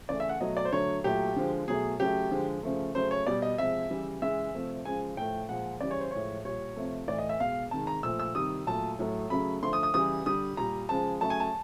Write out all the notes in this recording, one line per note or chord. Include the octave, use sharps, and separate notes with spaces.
C#3 E3 A3 D5
E5
F#5
B2 F#3 A3 D#5
D5
C5
D3 F#3 A3 C#5
A#2 F#3 A3 G4
D3 F3 G#3
B2 F#3 A3 G#4
C#3 F#3 A3 G4
D3 F3 G#3
C#3 F3 A3
C#3 F#3 A3 C5
C#5
B2 G3 D5
D#5
C3 F3 G#3 E5
C#3 E3 G3
C#3 E3 G#3 E5
C3 F3 A3
C#3 F3 G#3 G#5
A2 F3 A3 G5
A#2 F3 G#3 F#5
C#3 E3 G3 D5
C#5
C5
A2 F3 G#3 C#5
A#2 G3 C#5
C3 F3 A3
A2 E3 A3 D5
D#5
E5
B2 G#3 F5
C3 D#3 G#3 A5
A#5
A#2 F3 A3 E6
E6
C3 D#3 G3 D#6
A#2 F#3 A3 A5
A2 F#3 A3
C#3 F#3 A3 B5
D3 F3 A3 C6
D#6
D#6
C#3 E3 G3 D#6
D3 G3 D#6
A#2 G3 A#5
C#3 F3 G#3 A5
C#3 F#3 A3 A5
G#5
A5